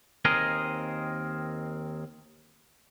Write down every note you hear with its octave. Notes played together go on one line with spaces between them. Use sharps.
D#2 C4 G#4 A#4 D#5